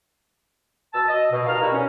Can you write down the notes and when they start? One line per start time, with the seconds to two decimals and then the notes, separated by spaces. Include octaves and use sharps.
0.94 B2 A5 E6
1.08 D#5
1.31 B2
1.47 G2 D#3 A#4 F5 A#5 F6
1.61 E2 G3 D#4 E4 F#4
1.72 C#4